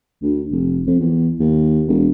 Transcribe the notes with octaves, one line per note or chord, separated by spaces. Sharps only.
D2
F1
F2
E2
D#2
E1